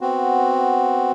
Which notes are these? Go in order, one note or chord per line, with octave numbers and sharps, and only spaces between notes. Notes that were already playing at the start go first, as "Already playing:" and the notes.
B3 C4 F#4